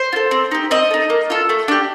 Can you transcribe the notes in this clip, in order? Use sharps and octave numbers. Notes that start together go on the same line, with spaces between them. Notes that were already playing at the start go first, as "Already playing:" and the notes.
Already playing: C5
F4
A4
C4
D#4 G4
C4 D#5
D#4 A4
A#3
F4 A4
A3
D4 G4